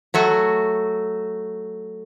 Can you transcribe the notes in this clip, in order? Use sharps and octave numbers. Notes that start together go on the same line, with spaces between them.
F#3 A3 F#4